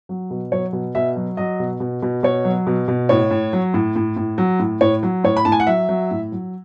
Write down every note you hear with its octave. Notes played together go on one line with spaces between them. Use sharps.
F#3
B2
F#3 C#5
B2
B2 E5
F#3
F#3 D#5
B2
B2
B2
B2 C#5
F#3
B2
B2
A2 C#5
A2
F#3
A2
A2
A2
F#3
A2
A2 C#5
F#3
A2 C#5
B5
A2 A5
G#5
F#5
F#3 E5
F#3
A2
F#3